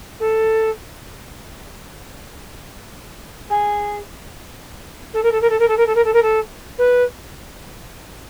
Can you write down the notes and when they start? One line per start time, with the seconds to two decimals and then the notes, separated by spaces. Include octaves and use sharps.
0.19 A4
3.49 G#4
5.13 A4
5.22 A#4
5.31 A4
5.41 A#4
5.49 A4
5.59 A#4
5.68 A4
5.77 A#4
5.86 A4
5.94 A#4
6.04 A4
6.13 A#4
6.22 A4
6.78 B4